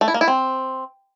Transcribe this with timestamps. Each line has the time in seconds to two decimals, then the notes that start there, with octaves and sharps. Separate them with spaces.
0.01 A3
0.08 E4
0.14 A#3
0.21 E4
0.28 C4